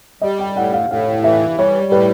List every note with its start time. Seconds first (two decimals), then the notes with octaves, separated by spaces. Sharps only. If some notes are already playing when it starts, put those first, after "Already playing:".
0.21 G3 D#5
0.39 G5
0.55 A2 F#5
0.72 F5
0.90 A2 F5
1.24 E3 E5
1.58 G3 C#5
1.92 A2 B4